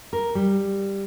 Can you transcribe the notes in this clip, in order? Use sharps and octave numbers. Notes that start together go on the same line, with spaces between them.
A#4
G3